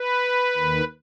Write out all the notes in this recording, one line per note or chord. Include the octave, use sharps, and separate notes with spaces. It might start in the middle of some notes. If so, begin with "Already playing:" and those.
Already playing: B4
D#2 D#3